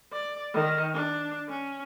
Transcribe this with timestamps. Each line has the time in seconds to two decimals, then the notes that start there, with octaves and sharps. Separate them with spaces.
0.12 D5
0.54 D#3
0.94 D4
1.49 C#4